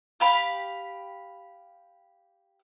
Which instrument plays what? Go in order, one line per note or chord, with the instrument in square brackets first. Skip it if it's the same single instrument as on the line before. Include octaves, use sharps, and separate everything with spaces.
[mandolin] G4 F5 B5